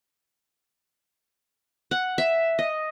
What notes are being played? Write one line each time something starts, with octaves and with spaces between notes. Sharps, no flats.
F#5
E5
D#5